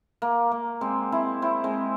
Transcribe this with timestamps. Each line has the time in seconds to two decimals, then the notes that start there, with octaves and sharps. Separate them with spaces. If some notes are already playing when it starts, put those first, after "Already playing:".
0.22 A#3
0.52 A#3
0.81 G#3 C4
1.12 C4 E4
1.42 C4 E4
1.64 G#3 C4